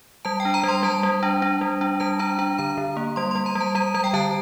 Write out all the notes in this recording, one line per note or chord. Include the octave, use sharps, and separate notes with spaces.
G3 A5
G5
D4
A#5
G3 C6
G3 A5
G3
D4
D4
G3
D4
G3 A5
D4 A#5
D4 A#5
D3 A#5
D3
A#3
G3 C6
G3 C6
A#5
G3
A5
G3 A#5
G3 A#5
G5
D3 A5